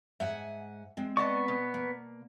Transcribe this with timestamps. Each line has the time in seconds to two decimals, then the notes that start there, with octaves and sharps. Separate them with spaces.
0.20 G#2 E5 F#5 G#5
0.97 G#3 C4
1.17 B3 D5 D#5 A5 C#6
1.48 B2
1.74 A#3